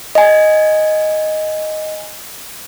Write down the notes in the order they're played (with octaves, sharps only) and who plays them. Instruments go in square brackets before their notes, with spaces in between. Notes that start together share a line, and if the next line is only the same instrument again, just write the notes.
[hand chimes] D#5 G#5